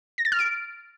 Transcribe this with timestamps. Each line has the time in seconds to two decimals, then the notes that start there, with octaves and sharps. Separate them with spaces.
0.18 A#6
0.25 A6
0.32 F6
0.39 D7